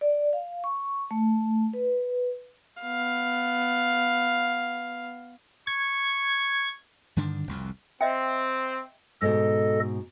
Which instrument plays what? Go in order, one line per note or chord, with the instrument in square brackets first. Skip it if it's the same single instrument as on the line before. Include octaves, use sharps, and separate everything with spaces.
[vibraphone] D5
F5
C#6
A3
B4
[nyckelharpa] B3 F5
[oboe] C#6 [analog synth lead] G#6
[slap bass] G2 D3 D#3 D4
F1 C2 F2
[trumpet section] C4 [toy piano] D#5 E5 G5
[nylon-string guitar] G#2 B2 [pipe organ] A4 D#5